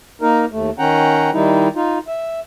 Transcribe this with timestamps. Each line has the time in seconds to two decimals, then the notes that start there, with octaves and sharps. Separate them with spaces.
0.21 A#3 D#4 A#4
0.51 D#2 A3
0.79 D#3 C#4 F#5 G5 A#5
1.33 D#3 G3 D#4 E4
1.75 D#4 F4
2.07 E5